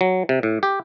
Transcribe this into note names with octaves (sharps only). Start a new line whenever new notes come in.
F#3
C3
A2
G4